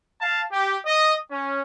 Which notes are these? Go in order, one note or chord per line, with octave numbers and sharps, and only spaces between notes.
F5 A5
G4
D#5
C#4